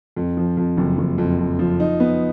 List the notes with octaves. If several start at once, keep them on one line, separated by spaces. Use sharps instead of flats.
F2
F3
F2
F#1
F#1
F2
F2
F3
D#4
B3